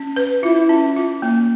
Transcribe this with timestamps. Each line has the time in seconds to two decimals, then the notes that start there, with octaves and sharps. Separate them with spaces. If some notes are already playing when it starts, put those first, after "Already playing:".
Already playing: C#4
0.16 B4
0.43 E4 F4
0.69 C#4
0.96 F4
1.22 A#3